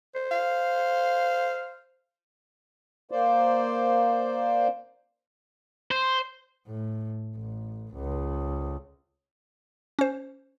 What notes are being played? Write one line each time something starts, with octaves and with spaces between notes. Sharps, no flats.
C5
F5
A#3 C5 D5
C5
A2
A1
C#2
C#4 C5